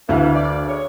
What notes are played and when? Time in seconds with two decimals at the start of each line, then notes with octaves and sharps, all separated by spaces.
0.09 D2 E3 F5
0.36 D5
0.68 C#3 C#5